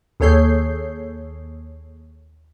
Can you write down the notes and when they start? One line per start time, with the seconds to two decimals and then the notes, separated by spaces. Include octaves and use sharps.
0.20 D#2 G#4 A4 C#5 G6 C7